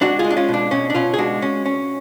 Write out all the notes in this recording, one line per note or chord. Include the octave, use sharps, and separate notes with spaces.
G#3 D4 F#4
F4 G#4
G#3
D4
C#4 F4
B2
D4
B2 C#4
D4
B2 C#4 F4
G#4
G#3 D4 F#4
C#4
C#4